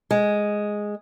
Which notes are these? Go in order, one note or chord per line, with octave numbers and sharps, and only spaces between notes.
G#3